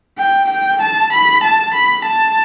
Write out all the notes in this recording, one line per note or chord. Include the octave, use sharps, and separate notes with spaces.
G5
G5
A5
B5
A5
B5
A5